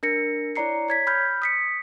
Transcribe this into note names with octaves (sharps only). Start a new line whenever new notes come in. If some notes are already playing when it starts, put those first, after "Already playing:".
D4 A#4 A#6 C#7
E4 C#5 D5 A#5 C7 C#7
C#5 G#6 B6
B5 F6 G6
D#6 B6 C#7